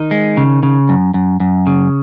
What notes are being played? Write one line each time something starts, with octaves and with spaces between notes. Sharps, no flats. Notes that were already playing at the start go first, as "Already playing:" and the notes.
Already playing: D#3 D#4
G#3
C#3
C#3
F#2
F#2
F#2
C#3